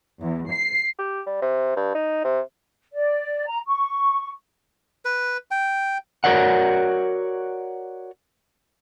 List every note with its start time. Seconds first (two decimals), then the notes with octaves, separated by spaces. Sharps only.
0.21 E2
0.50 C7
0.99 G4
1.26 G3
1.42 C3
1.76 G2
1.95 D#4
2.24 C3
2.93 D5
3.47 A#5
3.66 C#6
5.05 B4
5.51 G5
6.24 F#4 A#4 C#5 D5 F#5